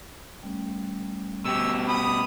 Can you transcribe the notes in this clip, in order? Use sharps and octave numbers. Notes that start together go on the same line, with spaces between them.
G3 A3 C#4
B2 G4 E6
B5 D#6